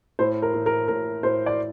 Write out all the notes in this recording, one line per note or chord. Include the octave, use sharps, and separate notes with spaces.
A2 C5
A#4
A2
A#4
A2 A#4
A2 C5
D5